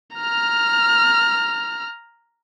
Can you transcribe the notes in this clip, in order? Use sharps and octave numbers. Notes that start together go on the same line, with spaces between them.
A#5 F6